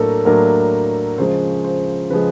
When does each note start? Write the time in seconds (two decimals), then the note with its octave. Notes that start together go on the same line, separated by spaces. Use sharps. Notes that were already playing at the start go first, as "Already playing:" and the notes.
Already playing: A2 F#3 A#3 D4 A4 A#4
0.25 A2 F#3 A#3 D4 A#4
1.18 C#3 F3 G#3 C5
1.64 C5
2.10 C#3 F3 G#3 B4